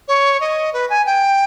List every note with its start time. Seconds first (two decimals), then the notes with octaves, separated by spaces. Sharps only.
0.08 C#5
0.41 D#5
0.73 B4
0.90 G#5
1.06 G5